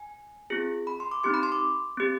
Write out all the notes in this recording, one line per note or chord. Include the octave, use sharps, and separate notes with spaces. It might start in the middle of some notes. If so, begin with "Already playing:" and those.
Already playing: G#5
C4 F4 G#4
B5
C6
D6
C4 D#4 G4 C6
B5
C6
D6
C4 G4